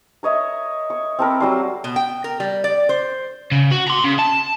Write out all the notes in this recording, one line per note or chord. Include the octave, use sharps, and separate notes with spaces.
A#4 C#5 D#5 E5
C#6
C4 A4 A#4 B5
F#3 G3 C6
B2
G5
A#4
G3
D5
C5
C#3
F#4
A#5 C6
C#3
A5